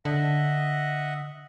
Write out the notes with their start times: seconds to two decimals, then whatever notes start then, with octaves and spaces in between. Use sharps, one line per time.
0.05 D3 D#5 E5 F#5